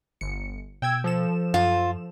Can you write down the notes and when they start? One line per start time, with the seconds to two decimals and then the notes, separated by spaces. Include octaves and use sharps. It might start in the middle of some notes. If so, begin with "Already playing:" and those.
0.21 G1 C#7
0.82 B2 G5 E6 G#6
1.04 F3 A4 E7
1.54 F#2 F4